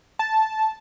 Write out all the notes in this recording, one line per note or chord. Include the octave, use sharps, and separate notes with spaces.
A5